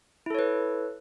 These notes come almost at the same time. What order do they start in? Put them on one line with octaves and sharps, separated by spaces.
E4 A4 C#5 B4